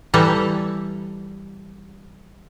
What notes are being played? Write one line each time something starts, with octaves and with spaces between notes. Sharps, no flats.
E3 G3 A4 A#5